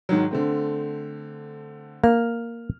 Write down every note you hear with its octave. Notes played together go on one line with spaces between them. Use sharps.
G#2 D#3 F#3
D3 A3 C4
A#3 F6